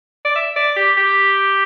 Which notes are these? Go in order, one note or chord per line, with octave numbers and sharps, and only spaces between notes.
D5
E5
D5
G4
G4